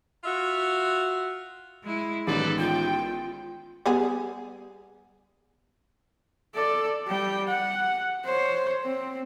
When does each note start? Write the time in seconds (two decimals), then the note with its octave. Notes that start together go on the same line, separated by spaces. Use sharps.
0.24 F4 F#4 E5
1.83 G#3 E4
2.27 A1 D#3 G#3 B3 D#4 A4 B4 D5
2.59 F4 G5
3.86 G3 B3 G#4
6.55 A4 D5
7.08 G3 G5
7.48 F#5
8.25 C5 C#5
8.85 C4